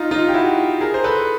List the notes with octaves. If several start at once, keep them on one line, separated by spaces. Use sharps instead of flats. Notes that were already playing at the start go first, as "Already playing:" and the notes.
Already playing: D#4 F4
D#4 F4
G4
E4 F#4
G#4 A#4
C5
A4 B4